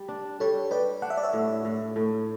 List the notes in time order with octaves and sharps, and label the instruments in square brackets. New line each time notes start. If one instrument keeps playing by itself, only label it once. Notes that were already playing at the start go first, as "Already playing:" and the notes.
Already playing: [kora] G3
D4
[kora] G3 [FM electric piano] A4 C#5
[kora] G4 [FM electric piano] B4 D5
[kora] D4 [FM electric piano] F#5
[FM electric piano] E5
D5
C#5 E5
[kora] A2
A2
A2